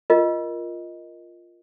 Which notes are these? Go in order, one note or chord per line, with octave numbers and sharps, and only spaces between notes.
F4 A#4 D#5